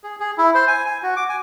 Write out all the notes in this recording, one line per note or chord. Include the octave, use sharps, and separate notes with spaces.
G#4
G#4
E4
C5
G#5
G#5
F#4
D6
G#5